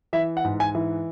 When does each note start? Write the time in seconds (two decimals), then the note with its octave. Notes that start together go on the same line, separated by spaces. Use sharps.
0.13 E3 E5
0.37 F#5
0.44 G#2
0.60 G#5
0.75 E3